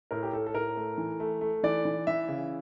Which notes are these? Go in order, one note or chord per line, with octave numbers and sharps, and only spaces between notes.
A2 A#4
G4
A2 A4
A4
A2 A#4
A3
E3
A3
A3
E3 D5
E3
E3 E5
C#3